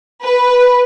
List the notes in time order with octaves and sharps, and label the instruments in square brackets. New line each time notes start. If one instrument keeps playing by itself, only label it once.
[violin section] B4